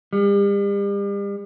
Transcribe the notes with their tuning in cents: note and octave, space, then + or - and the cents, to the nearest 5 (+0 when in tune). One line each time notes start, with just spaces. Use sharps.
G3 +40